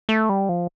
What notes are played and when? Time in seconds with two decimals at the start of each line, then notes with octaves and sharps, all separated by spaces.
0.09 A3
0.29 G3
0.49 F3